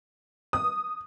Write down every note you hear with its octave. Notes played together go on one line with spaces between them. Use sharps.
D#6